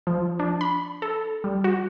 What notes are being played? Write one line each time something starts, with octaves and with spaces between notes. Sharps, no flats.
F3
D4
B5
A4
G3
F#4